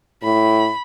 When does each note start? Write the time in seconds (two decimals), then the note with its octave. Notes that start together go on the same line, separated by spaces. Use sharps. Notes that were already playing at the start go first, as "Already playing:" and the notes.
0.23 A2 B5